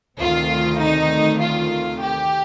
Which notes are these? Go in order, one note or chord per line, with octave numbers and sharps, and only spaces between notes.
D2 C3 D#3 F4
D#4
F4
G4